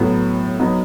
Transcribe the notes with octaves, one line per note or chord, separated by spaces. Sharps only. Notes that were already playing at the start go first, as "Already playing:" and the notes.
Already playing: A2 F#3 B3
F#3 B3 D#4